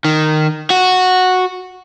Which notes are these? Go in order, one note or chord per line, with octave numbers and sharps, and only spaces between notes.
D#3
F#4